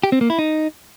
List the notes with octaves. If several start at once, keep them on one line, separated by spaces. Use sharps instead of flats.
G4
C4
A#3
E4
D#4